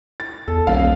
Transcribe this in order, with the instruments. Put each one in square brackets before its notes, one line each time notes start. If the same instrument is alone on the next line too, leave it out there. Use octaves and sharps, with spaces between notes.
[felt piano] A6
[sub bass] E2 [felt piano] A4
[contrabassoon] D#1 [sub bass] B1 [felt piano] F5